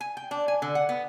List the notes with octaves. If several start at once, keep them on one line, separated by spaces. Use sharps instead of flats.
G#5
G5
D4
G#5
D3
F#5
B3